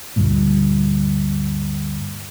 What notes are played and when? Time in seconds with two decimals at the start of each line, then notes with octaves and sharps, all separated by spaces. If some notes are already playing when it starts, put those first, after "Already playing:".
0.16 D2 G2 A#2